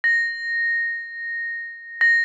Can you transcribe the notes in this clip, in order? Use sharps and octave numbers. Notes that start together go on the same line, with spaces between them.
A#6
A#6